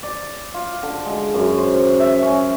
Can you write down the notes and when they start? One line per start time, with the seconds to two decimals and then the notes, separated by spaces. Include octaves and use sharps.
0.03 D5
0.54 F4
0.83 D3
1.06 G#3
1.34 F#2
1.58 C5
2.00 E5
2.22 C#4